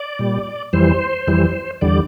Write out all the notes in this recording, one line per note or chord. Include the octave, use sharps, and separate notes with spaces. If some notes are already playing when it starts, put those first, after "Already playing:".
Already playing: D5
A#2 G3
F2 E3 G3 C5
F2 E3 G3
E2 D3 G3 D5